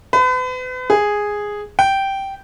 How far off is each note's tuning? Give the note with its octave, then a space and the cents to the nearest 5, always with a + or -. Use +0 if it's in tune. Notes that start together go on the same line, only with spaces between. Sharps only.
B4 +40
G#4 -5
G5 -10